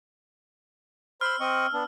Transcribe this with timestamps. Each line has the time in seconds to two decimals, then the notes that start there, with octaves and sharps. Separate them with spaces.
1.21 C5 B5 C6 E6 F6
1.40 C4 D#5 C#6
1.73 B3 D4